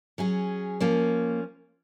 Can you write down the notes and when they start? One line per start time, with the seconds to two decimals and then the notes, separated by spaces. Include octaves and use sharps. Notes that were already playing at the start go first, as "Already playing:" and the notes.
0.18 F#3 C#4 G#4
0.80 F3 A#3 C#4